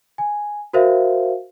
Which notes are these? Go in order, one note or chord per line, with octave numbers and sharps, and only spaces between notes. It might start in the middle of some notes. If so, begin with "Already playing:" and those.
G#5
F#4 A#4 C5 E5 F5